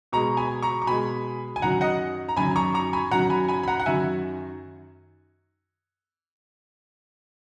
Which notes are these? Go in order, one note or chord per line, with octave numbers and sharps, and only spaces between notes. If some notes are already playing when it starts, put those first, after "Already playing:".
B2 G#3 A#5 C#6
G#5 B5
A#5 C#6
C#6
B2 G#3 G#5 B5
G#5
F#2 D#3 F#3 F#5 A#5
D#5 F#5
A#5
F#2 D#3 F#3 G#5 B5
A#5 C#6
A#5 C#6
G#5 B5
F#2 D#3 F#3 F#5 A#5
A#5
G#5 B5
G#5 B5
B5
F#5 A#5
F#5
F#2 D#3 F#3 E5 G#5